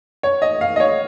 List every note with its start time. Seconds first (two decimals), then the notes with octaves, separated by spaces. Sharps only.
0.23 C#5
0.42 D#5
0.61 F5
0.76 D#5
0.80 C#5